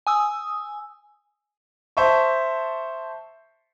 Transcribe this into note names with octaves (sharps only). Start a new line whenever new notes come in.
G#5 D#6 E6
C5 E5 A5 C#6